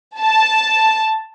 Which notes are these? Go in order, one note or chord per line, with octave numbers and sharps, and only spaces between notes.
A5